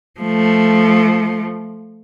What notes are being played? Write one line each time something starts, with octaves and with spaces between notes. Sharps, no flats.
F3 A3